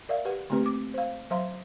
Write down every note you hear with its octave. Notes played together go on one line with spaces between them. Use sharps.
A#4 D5 E5 F5
G4 B4 F#5
D3 A3 A#3 C4 G4 B4
D6
C5 F5
F#3 C5 E5 F5 A#5 C6